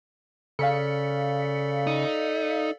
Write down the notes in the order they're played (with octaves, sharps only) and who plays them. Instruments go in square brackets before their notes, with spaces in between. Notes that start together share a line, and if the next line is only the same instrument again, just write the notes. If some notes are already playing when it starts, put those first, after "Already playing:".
[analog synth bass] C#3 [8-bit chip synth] A4 D5 [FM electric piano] F5 B6 C#7
[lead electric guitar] D#4